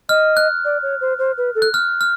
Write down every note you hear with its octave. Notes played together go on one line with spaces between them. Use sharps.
D#5 F6
F#6
D5
C#5
C5
C5
B4
A4
F#6
F6
F6